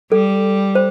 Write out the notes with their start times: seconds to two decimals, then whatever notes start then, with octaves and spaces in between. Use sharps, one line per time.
0.12 G3 A4
0.75 C5